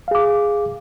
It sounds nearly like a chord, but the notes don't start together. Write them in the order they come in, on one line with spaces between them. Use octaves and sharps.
F5 G#4 D6